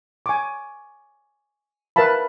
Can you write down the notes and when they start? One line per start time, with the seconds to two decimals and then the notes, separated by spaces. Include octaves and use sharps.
0.26 G#5 C#6 D6
1.96 A#4 B4 E5 F5 A5 B5